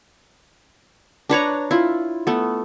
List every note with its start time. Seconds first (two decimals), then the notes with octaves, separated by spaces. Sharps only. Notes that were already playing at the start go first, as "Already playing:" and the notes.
1.29 D4 B4 C#5 A#5
1.71 E4 F4
2.27 A3 B3